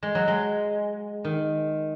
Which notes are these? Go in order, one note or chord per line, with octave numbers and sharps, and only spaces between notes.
G#3
F#3
G#3
D#3